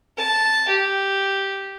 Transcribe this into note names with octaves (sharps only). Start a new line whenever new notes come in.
A5
G4